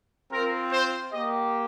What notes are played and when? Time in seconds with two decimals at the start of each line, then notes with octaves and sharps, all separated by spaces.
0.31 C4 F4 A#4
0.72 C5
1.12 A#3 G4 D#5